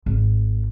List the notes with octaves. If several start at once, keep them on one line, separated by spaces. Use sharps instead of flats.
G#1